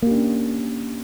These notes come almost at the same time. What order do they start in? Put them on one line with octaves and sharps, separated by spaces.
A#3 G4 D4 C#4